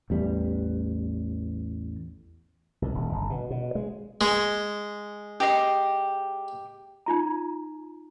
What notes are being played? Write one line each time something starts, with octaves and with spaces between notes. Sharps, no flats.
A1 E2 G3
C2
D#1
G1
B2
B2
G#3
G#3
G4 D#5 C6
D#4 F4 A#5